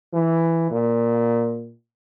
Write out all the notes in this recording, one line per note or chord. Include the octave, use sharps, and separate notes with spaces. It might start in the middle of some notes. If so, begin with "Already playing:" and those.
E3
A#2